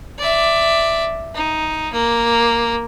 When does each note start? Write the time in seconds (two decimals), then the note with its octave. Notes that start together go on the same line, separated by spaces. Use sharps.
0.18 D5 E5
1.34 D#4
1.93 A#3